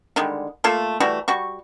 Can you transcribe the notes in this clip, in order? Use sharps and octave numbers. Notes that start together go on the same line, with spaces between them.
D3 D#3 G3 G#3
A3 A#3 F4 A4
E3 G3 A3 F#4
G3 F#4 C#6